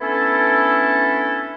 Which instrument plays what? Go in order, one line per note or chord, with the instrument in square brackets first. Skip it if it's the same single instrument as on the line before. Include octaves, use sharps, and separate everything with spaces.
[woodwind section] A3 B3 C#4 D4 E4 A4